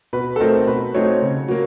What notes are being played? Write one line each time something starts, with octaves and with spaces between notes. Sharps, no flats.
B2 B4
A4
F#3 A3 C4 D#4 A#4
B2 B4
F#3 A3 C4 D#4 C#5
C#3
F#3 A#3